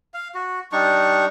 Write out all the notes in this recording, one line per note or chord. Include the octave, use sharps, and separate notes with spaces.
F5
F#4
G3 D4 D#4 C#6